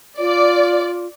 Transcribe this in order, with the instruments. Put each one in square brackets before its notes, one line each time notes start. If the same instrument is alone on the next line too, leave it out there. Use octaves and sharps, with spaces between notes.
[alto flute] F4 [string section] D5